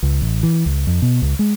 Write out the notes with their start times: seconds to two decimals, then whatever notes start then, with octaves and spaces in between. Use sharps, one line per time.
0.03 C#2
0.22 A1
0.43 E3
0.66 C#2
0.87 F2
1.02 B2
1.22 C#2
1.39 G#3